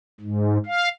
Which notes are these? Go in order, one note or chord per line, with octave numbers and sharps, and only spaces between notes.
G#2
F5